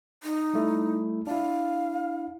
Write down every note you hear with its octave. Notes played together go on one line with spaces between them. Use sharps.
D#4
G3 A3 E4
D4 E4 F5